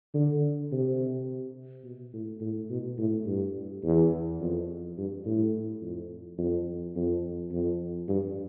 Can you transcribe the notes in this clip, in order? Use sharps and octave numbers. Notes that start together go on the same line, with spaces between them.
D3
C3
B2
A2
A2
B2
A2
G2
E2
F2
G2
A2
F2
F2
F2
F2
G2